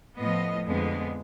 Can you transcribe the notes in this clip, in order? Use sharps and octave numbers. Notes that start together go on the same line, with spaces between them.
A2 F3 B3 D#5
F2 D3 G#3 B3